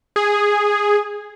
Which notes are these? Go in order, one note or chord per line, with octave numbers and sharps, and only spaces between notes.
G#4